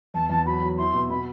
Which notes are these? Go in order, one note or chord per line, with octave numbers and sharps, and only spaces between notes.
E2 A5
E2 A5
F#3 B5
F#3
E4 C6
B2
B2 B5